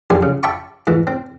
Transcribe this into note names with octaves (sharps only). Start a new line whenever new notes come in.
A#1 F#2 G4 G#5 C6
C#3
E5 G5 A5 B5 C#6 D6
G#2 E3
C4